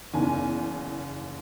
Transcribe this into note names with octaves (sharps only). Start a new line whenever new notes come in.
F#1 E2 D#3 G#5